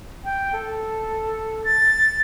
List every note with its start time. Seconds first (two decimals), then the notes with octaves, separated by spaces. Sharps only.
0.25 G5
0.53 A4
1.65 A6